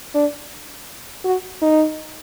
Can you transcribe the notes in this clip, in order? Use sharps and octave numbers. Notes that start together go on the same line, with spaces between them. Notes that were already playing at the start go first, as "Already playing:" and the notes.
D4
F#4
D#4